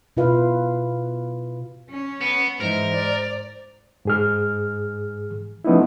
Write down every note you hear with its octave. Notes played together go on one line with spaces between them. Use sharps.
B2 E4 F4 B4 F5
C#4
B3
G#2 E3 A#4 C5
D5
G#2 G#4 F6
F3 A3 B3 C#4 D#4 E4